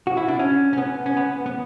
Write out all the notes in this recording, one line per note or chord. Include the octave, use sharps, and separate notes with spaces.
F#4
E4
D4
C#4
C#4
B3
C#4
B3
B3